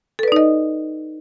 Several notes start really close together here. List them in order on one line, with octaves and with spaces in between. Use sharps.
A4 B4 D5 D#4 D#5